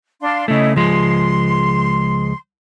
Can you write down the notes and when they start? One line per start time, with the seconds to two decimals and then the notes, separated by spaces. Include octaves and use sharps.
0.21 D4 F5 C6
0.48 C#3 A3 E4 C#5 D#5
0.76 C#2 F3 G#3 C6